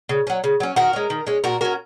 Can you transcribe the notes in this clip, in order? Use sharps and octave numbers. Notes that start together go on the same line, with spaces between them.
C#3
F#3 C#4
C#3
F#3 C#4
D#3 F#4 A#4
G#3 C#4
D#3
G#3 C#4
A#2 F#4 A#4
F#3 C#4 F#4 A#4